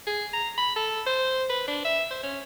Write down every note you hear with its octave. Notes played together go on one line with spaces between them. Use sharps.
G#4
A#5
B5
A4
C5
B4
D4
E5
C5
C#4